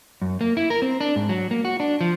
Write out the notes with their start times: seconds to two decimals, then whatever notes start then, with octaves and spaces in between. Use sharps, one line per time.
0.22 F#2
0.41 A#3
0.57 E4
0.70 A#4
0.82 C4
1.01 D4
1.16 G#2
1.29 F#3
1.51 A#3
1.65 F#4
1.80 D4
2.01 F3